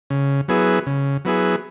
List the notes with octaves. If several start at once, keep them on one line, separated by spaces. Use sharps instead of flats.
C#3
F#3 B3 E4 G#4
C#3
F#3 B3 E4 G#4